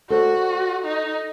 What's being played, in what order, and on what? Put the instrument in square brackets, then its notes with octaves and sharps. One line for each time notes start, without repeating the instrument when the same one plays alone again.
[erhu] F#4 [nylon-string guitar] A4 C5 D5
[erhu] D#4